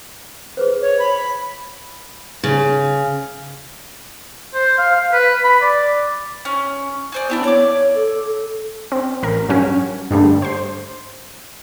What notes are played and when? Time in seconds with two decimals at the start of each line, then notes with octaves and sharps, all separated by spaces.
0.57 G#4 B4 C5
0.82 C#5
0.99 B5
2.43 C#3
4.54 C5
4.78 F5
4.95 F5
5.12 B4
5.44 B5
5.62 D5
6.45 C#4
7.12 G#4 C5 D5
7.30 B3 D4 E4 G4
7.44 C#5 D5 D6
7.95 A4
8.92 C4
9.23 A1 A#4
9.49 G2 F#3 C#4 F#4
10.11 G2 D3 G3 A3
10.42 C5 C6